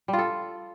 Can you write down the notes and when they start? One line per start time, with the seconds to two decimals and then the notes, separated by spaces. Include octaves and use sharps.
0.08 G3
0.13 F4
0.19 A4